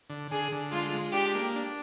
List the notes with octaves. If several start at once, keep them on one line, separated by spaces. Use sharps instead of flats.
D3
D3 G#4
D3
G#3 F4
G#3
D4 G4
A#3
D4